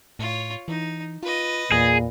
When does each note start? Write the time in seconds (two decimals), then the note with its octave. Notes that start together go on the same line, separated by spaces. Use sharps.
0.19 A2 F4 C#5
0.68 E3 D#4
1.23 F4 B4 D#5
1.72 E2 A#2 G#4